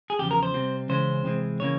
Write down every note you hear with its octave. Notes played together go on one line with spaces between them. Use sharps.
G#4
E2 C#3 F3 G4
A#4
C5
C3 G3 C4
C#3 E3 G#3 C#4 C5
C3 E3 G#3 C4
C#3 E3 A#3 C#5